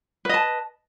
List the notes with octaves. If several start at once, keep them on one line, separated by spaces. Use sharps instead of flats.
B4 D#5 A5